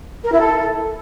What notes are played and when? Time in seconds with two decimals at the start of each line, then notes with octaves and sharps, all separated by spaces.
0.24 A#4
0.32 E4
0.40 A4